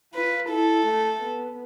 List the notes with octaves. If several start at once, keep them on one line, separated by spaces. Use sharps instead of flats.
F4 B4
E4 A4
A3
B3